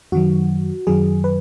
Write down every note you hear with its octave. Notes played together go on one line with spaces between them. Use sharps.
F#2 D#3 F#3 F#4
F#2 D#3 F#3 G#4
B4